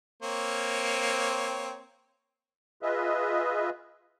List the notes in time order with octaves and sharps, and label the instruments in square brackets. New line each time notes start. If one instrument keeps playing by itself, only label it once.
[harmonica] A#3 C4 C#5
[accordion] F4 G#4 B4 D#5 E5